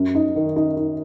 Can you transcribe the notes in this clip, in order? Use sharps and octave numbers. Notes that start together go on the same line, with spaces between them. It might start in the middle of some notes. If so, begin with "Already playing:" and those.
Already playing: F#2
D#4
D#3
D#4
D#4